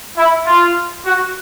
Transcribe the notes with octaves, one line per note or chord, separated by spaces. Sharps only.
E4
F4
F#4